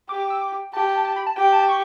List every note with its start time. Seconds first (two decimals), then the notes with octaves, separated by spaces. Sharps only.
0.09 G4 D6
0.20 D6
0.30 E6
0.41 D6
0.73 G4 A5
0.89 A5
1.05 A5
1.16 B5
1.27 A5
1.36 G4 G5
1.52 A5
1.68 C#6